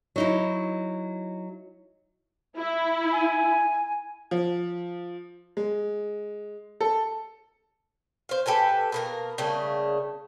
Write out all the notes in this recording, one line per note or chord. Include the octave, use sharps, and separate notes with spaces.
F#3 D#4 E4
E4
G#5
F3
G#3
A4
C5 F5
G4 A4 B4 G#5
B2 A#3 A#4
C#3 G3 A3 A#3